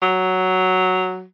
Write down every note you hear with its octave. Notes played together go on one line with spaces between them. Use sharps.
F#3